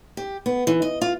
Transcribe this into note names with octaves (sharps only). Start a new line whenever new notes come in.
G4
B3
E3
D#5
F4